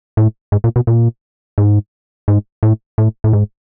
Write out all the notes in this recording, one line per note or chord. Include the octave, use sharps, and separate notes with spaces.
A2
G#2
A#2
B2
A#2
G#2
G#2
A2
A2
A2
G#2